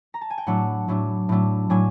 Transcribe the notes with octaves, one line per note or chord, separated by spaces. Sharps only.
A#5
A5
G#5
G5
A2 F#3 A3 D4 F#5
A2 F#3 A3 D4
A2 F#3 A3 D4
A2 F#3 A3 D4 G#5